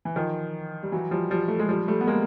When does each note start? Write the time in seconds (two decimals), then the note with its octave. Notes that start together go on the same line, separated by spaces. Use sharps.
0.05 E3
0.16 D#3 F3
0.83 G3
0.92 E3 F#3
1.11 F3 G3
1.30 F3 G3
1.48 A3
1.59 G#3
1.69 F3 G3
1.88 G3 A3
2.01 B3
2.07 G#3 A#3